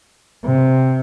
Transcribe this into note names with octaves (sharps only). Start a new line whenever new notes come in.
C3